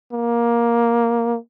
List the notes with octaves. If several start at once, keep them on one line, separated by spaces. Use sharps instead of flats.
A#3